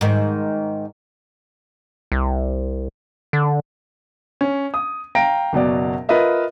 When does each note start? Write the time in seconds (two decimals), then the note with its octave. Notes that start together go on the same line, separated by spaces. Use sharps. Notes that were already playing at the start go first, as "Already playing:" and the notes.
0.01 G#2 D#3
2.12 C2
3.33 D3
4.41 C#4
4.74 D#6
5.15 F5 G5 A#5 A#6 D7
5.53 F#1 B2 F#3 D5
6.09 F4 A#4 B4 D#5 E5